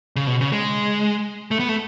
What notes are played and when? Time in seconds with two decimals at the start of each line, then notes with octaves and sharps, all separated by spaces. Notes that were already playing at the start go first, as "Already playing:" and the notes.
0.16 C#3
0.27 B2
0.41 C#3
0.53 G#3
1.51 A3
1.59 B3
1.69 A3